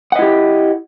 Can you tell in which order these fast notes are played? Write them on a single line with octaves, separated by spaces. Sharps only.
F#5 D#5 E4 G4